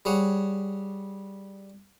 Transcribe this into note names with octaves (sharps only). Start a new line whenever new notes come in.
G3 G#4 C#5 F#5